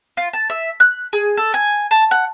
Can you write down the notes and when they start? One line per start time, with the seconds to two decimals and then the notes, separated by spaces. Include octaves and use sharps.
0.17 F4
0.33 A5
0.50 E5
0.80 F#6
1.13 G#4
1.37 A4
1.54 G#5
1.91 A5
2.11 F#5